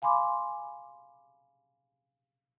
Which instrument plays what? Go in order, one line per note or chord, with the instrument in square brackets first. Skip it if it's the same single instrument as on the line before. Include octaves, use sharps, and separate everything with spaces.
[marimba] F5 G#5 B5 C6 D6